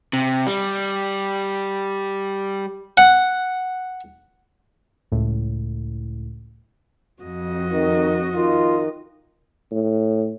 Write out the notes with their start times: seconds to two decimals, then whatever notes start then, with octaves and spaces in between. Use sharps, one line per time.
0.13 C3
0.47 G3
2.97 F#5
5.12 C#2 A2
7.22 F2 F#4 D#5
7.72 D#3
8.35 D#3 F4
9.71 A2